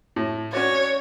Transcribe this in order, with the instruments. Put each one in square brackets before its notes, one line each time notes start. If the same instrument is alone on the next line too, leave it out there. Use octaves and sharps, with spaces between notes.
[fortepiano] A2
[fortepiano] C#4 F#4 D5 [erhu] C#5